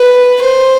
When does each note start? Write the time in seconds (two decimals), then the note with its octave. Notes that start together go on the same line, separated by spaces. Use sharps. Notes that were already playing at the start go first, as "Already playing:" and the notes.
Already playing: B4
0.41 C5